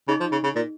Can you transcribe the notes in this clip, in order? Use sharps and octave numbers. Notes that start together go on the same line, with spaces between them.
C#3 D#4 G#4 D#5
F3
C#3
C#3
A#2